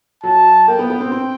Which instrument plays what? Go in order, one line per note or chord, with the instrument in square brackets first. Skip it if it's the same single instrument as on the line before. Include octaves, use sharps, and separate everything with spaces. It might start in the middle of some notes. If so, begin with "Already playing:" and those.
[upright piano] F#3 [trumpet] A5
[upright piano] A#3 [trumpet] G5
[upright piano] B3
B3
C4
C4